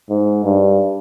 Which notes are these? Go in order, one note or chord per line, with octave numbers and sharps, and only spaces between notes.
G#2
G2